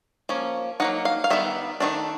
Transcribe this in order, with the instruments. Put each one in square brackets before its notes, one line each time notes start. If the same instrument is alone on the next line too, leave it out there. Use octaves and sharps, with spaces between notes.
[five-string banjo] F3 A#3 C#4
F#3 A#3 D#4 F#5
F5
F5
D#3 G3 B3 E5
D#3 F#3 A3 D4